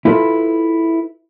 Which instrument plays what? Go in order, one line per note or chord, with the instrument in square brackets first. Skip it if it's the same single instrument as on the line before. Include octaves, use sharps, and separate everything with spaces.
[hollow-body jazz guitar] E4 F4 A4 B4 E5